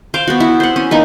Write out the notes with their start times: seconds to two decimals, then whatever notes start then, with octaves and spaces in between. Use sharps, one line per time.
0.14 C5 F5 D6
0.28 B3 F#4
0.40 E4
0.60 C5 F#5
0.76 C#4
0.91 A#3 D#4 B4